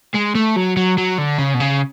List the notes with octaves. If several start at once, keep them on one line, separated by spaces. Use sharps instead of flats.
G#3
A3
F#3
F#3
F#3
D3
C#3
B2
C#3